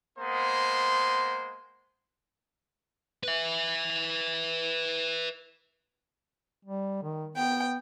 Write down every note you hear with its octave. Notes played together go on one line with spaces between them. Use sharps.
G#3 A#3 B3 C5
B4 E5
G3
D#3
B3 G5